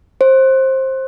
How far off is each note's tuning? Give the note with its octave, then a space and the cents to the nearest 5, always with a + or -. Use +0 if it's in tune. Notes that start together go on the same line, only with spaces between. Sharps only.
C5 +20